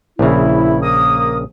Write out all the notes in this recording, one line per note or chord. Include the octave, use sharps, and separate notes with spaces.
A#1 C#3 E4
A#3 A#4 D#6